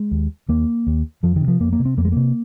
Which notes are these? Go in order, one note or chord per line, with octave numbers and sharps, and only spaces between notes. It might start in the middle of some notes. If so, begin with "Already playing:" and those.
Already playing: G#3
D#2
D#2 A#3
D#2
F2 F3
D#3
C3
F3
F2 A#3
A#3
C3
C4
F2 A#3
G#3
C3 A#3